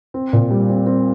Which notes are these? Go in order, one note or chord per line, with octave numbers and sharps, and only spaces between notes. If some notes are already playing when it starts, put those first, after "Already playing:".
C4
A#2
G3
C4
C4